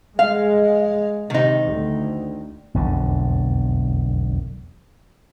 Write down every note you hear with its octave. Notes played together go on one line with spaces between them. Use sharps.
G#3 F5
C3 D#3 D#4
D2
E1 B1 F2 D3